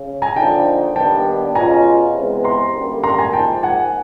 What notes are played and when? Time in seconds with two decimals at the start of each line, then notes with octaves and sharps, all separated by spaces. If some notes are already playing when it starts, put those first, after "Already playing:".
Already playing: C#3
0.22 G#5 A#5
0.36 D3 F3 A#3 D#4 G5 A5
0.96 D#2 D#3 G3 B3 D4 G5 A5
1.55 B2 G#3 C#4 F4 G#5 A#5
2.15 C3 E3 G#3 B3
2.44 A#5 C6
2.75 F#2 D3 G3 A#3
3.04 A#5 C6
3.18 G#5 A#5
3.33 G#2 F3 A#3 D#4 G5 A5
3.63 F#5 G#5